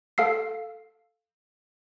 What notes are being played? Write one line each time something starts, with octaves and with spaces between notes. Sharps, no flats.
A4 F5 E6 C7